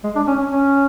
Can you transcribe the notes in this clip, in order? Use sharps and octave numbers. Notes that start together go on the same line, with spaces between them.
G#3
D4
C#4
C#4
C#4